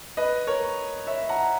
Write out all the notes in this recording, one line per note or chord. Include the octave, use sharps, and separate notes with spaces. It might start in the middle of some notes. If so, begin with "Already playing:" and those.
B4 D#5
A#4 C#5
C#5 E5
F#5 A#5